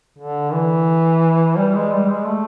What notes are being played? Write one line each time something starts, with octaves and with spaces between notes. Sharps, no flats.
D3
E3
G3
G#3
G3
G#3
A3